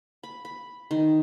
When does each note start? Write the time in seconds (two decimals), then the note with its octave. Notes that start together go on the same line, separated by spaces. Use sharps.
0.23 B5
0.45 B5
0.91 D#3